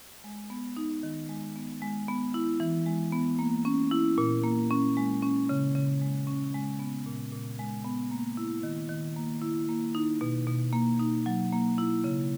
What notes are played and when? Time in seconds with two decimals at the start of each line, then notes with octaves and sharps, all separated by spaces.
0.24 G#3
0.50 B3
0.77 D#4
1.03 D#3
1.29 G#3
1.56 B3
1.82 G#3
2.08 B3
2.34 E4
2.60 E3
2.86 G#3
3.13 B3
3.39 A#3
3.65 C#4
3.91 E4
4.18 A#2
4.44 A#3
4.71 C#4
4.97 G#3
5.22 C#4
5.49 C#3
5.75 C#3
6.01 G#3
6.27 C#4
6.54 G#3
6.79 B3
7.06 A#2
7.32 A#2
7.59 G#3
7.85 B3
8.11 A#3
8.37 E4
8.63 D#3
8.89 D#3
9.16 A#3
9.42 E4
9.69 A#3
9.95 D#4
10.21 B2
10.47 B2
10.73 A#3
10.99 D#4
11.26 F#3
11.52 A#3
11.78 E4
12.04 C#3